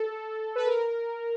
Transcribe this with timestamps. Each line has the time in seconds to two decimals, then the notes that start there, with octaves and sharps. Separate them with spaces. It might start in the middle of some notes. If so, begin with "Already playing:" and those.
Already playing: A4
0.56 B4
0.67 A#4